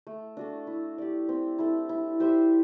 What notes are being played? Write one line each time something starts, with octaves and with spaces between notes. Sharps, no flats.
A3
D4 F#4 A4
E4
G4 D5
C4
E4 A4
E4
G4 C5 E5